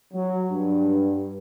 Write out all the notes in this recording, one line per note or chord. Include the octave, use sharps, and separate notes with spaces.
F#3
G2